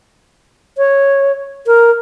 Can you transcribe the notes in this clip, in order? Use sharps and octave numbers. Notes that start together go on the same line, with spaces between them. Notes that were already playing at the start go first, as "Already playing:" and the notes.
C#5
A#4